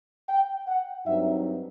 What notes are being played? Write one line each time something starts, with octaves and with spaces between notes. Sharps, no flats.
G5
F#5
G2 F#3 C4 D#4 E5